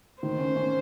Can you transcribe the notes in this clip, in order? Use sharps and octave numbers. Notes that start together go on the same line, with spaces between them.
D#3 C5
C#4
C#4